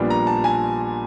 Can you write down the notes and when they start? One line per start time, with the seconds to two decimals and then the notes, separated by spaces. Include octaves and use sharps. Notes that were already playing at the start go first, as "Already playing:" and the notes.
Already playing: A#1 A#2 G3 B3 D4
0.10 A#5
0.27 A5
0.44 G#5